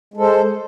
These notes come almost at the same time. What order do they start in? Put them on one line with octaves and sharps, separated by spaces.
G#3 A4 C5